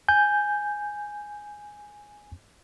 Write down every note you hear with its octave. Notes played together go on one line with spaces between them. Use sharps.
G#5 G6